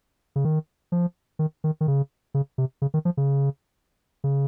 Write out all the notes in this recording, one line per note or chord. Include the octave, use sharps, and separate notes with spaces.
C#3
D#3
F3
D#3
D#3
D#3
C#3
C#3
C3
C#3
D#3
F3
C#3
C#3